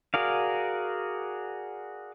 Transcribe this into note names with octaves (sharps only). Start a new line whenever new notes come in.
F#4 G#4 A#4 D5 F5